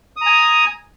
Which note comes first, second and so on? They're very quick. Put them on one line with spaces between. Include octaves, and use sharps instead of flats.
D#6 A#5 G#5